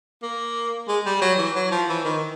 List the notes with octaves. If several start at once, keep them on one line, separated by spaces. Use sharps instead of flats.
A#3
G#3
G3
F#3
E3
F#3
F3
E3
D#3